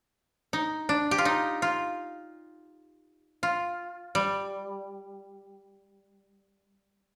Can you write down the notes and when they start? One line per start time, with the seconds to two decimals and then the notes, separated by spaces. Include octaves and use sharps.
0.53 D#4
0.89 D4
1.11 G4
1.18 F4
1.25 D#4
1.62 F4
3.43 F4
4.15 G3